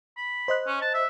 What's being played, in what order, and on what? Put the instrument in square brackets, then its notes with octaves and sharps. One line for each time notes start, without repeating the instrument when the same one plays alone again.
[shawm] B5
[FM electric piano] C5 D#5 F#6
[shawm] C#4
A5
E5